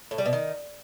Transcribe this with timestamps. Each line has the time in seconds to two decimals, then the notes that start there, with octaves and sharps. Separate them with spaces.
0.11 A2
0.18 G3
0.26 B2
0.33 D#3